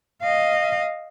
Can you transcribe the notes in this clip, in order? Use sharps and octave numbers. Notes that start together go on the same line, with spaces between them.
D#5 F5